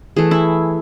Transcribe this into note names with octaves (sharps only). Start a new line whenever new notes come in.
E3 A3 G#4
E4